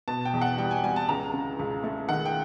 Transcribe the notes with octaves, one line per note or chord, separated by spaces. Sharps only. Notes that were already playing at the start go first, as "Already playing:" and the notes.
B2 A5
G5
E2
F#5
G3 G5
G#5
G3 G#5
A5
C#2 A#5
C#3
C#2
A3
D#3 F#5
G5